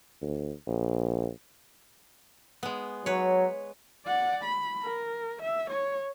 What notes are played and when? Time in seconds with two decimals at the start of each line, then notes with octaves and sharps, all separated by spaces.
0.22 D2
0.67 A#1
2.63 G#3 B3
3.06 F#3 B4 C#5
4.06 D5 F#5
4.44 B5
4.83 A#4
5.42 E5
5.70 C#5